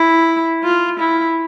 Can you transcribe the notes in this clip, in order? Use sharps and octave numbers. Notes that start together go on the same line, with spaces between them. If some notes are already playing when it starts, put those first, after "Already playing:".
Already playing: E4
F4
E4